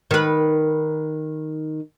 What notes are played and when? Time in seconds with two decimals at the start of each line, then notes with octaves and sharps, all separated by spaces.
0.11 D#3 B4